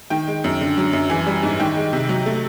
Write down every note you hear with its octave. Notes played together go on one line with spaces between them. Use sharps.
D#3 G5
G#3
F#2
D3
F#3
F#2
E3 G#5
G3
G#2
D#3 G5
G#3
C3
F#3
A3